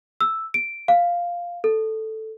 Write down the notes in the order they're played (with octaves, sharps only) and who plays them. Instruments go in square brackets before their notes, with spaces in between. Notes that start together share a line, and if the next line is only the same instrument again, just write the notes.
[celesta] E6
D7
F5
A4